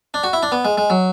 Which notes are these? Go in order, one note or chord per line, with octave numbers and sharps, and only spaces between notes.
D4
F#4
E4
D4
B3
G#3
G#3
F#3